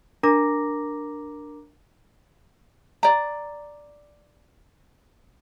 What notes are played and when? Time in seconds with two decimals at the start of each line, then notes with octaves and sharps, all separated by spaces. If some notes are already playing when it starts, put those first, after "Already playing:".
0.23 D4 A#4 A#5 D6 A#6
3.03 D5 A#5